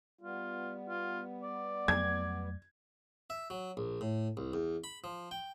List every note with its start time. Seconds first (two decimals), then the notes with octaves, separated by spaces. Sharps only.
0.21 G3 B3 F4
0.89 F4
1.43 D5
1.88 F2 F#3 A3 G#6
3.30 E5
3.50 F#3
3.77 A#1
4.01 A2
4.37 C2
4.54 E2
4.84 B5
5.04 F3
5.31 G5